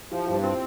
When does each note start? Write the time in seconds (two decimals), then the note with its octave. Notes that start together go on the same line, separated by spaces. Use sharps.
0.11 F3 E4 G4
0.27 G2 E4 G4
0.43 C4 F4